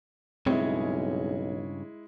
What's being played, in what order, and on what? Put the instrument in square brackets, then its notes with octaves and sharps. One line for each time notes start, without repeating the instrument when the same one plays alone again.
[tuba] B1 [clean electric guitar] G2 C#3 C#4 [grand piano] G#3 E4 [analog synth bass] C4